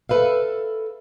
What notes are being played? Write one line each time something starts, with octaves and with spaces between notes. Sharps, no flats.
A4 B4 E5 F5